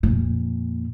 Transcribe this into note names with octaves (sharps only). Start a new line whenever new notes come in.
F2 A#2